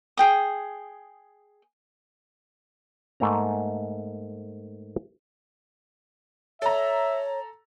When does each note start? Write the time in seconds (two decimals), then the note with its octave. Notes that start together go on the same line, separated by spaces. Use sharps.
0.17 G#4 G5 D#6
3.20 G#2 A3 A#3 A#5
6.62 A4 C#5 E5 A#5